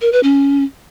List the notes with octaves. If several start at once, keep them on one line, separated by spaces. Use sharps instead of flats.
A#4
B4
C#4